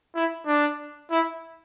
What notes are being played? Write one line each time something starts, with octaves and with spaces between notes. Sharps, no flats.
E4
D4
E4